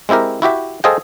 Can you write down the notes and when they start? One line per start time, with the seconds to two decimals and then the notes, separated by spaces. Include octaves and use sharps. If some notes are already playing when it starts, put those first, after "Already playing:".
0.09 G#3 C4 E4 G4 A#4
0.42 E4 F#4 G4 E5
0.84 G#4 A4 C5 D#5 F5 G5